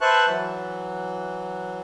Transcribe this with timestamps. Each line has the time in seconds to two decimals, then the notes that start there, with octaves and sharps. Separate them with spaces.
0.01 B4 C5 E5 A5 C#6 F#6
0.28 E3 F#3